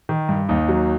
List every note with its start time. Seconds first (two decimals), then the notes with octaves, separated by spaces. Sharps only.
0.09 D#3
0.29 G2
0.49 D#2 D#4
0.68 F#3